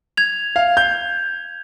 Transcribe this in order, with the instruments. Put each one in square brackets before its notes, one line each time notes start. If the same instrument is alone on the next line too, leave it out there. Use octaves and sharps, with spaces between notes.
[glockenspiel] G#6 F7
[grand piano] F5
G6